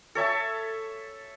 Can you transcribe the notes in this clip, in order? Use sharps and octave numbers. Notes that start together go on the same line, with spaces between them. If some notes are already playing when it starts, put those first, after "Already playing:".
A4 C#5 E5 A5